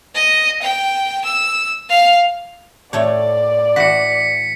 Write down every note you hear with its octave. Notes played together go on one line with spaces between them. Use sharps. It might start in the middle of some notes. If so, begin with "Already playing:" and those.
D#5
G5
E6
F5
A2 A3 C#5 D5
E3 F#4 B6 C#7